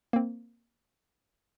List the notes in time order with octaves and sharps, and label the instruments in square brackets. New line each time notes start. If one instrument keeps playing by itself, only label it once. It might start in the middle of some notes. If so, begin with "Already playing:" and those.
[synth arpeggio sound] A#3 C4